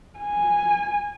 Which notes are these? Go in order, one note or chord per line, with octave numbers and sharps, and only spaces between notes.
G#5